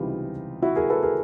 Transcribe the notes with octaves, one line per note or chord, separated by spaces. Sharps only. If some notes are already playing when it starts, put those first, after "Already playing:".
Already playing: C#2 C3 E3 G3 D#4 F4
E4 F#4
G#4 A#4
A4 B4
G#4 A#4